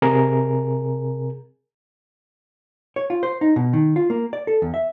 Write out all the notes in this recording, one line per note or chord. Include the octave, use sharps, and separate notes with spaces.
C3 G#4 A#4
C#5
F4
C5
D#4
B2
D#3
F4
A#3
D5
A4
E2
E5